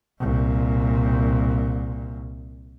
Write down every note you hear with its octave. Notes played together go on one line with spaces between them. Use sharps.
C2 A#2